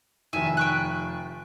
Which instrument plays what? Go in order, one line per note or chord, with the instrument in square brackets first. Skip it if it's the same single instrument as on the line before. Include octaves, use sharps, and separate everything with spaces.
[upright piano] F1 D#3 [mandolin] E5 G#5
[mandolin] G5 C#6 F#6